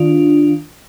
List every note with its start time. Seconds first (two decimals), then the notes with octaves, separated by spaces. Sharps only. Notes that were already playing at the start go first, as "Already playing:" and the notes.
Already playing: D#3 D4 F4